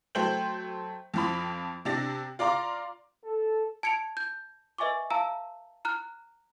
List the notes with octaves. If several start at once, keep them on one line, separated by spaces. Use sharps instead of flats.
F#3 A3 C5 G5 G6 F#7
F2 F3 B5
C3 D4 A6 A#6
F4 D5 F5 A#5 C6 D6
A4
A5 G#6 C#7 D7 F7
G6
B4 D#5 E5 G#5 C#6 D6
F5 A5 A#5 E6
A#5 F6 F#6